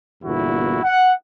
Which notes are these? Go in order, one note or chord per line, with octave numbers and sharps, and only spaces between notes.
G1 E2 A#2 E4 F#4
F#5